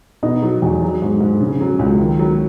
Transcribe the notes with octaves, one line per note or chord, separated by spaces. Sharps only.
B2 D#4
F#3
E2
F#3
G#2
G#2
C#3
F#3
C#2
D#3
F#3